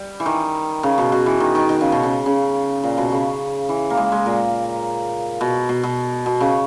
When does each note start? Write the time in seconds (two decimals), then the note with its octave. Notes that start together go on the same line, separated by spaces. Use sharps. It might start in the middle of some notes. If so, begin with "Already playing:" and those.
Already playing: G3
0.20 E3
0.26 D#3
0.83 C#3
0.98 B2
1.12 B2
1.26 E3
1.40 D#3
1.55 D#3
1.69 D#3
1.81 C#3
1.92 B2
2.03 C#3
2.26 C#3
2.83 A#2
2.98 B2
3.12 C#3
3.69 E3
3.90 A#3
3.97 G#3
4.12 G#3
4.26 A#2
5.41 B2
5.69 B2
5.83 B2
6.26 B2
6.40 C#3